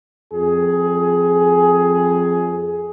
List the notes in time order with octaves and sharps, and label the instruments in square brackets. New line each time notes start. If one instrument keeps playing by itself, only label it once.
[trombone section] F2 G#4